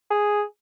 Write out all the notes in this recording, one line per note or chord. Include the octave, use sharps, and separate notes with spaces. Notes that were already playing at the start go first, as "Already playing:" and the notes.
G#4